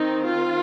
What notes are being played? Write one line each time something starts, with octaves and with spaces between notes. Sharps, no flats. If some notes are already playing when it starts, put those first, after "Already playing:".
Already playing: D#3 C4 D#4
F4